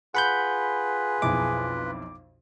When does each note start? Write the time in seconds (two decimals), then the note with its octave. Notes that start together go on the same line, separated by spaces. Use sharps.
0.15 F4 G#4 B4 F#5 B5 G6
1.22 B1 F2 E4 D6